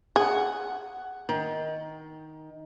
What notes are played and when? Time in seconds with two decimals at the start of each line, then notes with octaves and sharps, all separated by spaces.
0.16 G#4 F#5
1.29 D#3